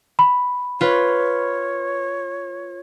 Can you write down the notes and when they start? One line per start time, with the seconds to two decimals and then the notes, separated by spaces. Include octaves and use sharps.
0.19 B5
0.81 F4 B4 C#5